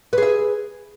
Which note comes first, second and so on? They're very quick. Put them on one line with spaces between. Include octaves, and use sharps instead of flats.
B4 G#4 E5